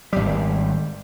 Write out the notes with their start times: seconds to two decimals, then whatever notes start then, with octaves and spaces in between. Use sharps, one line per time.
0.13 G#1 G3